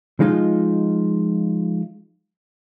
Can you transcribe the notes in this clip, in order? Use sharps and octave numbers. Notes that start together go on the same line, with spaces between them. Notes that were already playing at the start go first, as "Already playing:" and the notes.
F3 G#3 D#4 F4